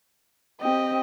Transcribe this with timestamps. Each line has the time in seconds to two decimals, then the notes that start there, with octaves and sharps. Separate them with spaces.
0.61 C4 G4 D#5 G5